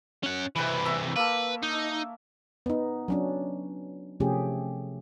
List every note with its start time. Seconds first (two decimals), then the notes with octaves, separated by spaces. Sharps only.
0.23 C#4 F#5
0.56 C3 E3 B4 B5
0.85 E5 A#5 C#6
1.16 A#3 A4 B4
1.63 D#4
2.66 B3 D#4
3.08 F#3 C#4 D4
4.20 C3 F3 A3 C#4 G4 G#4